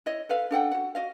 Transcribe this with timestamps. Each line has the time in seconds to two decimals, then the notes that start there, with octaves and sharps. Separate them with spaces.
0.06 E4 C#5 D#5
0.29 A4 B4 F5
0.51 D4 A4 F#5 G5
0.71 F#4 F#5
0.95 F#4 D#5 F5